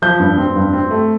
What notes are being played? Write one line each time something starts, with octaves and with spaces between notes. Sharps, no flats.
F3 G6
G2
C4
G2
C4
A3